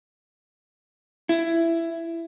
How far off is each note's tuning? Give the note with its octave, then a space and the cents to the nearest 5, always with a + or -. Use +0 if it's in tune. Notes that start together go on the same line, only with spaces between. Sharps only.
E4 +15